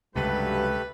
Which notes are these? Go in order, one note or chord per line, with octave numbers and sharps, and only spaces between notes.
C#2 G2 C3 F#3 A3 G4 A4 B4